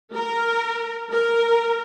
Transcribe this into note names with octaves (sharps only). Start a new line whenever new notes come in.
A#4
A#4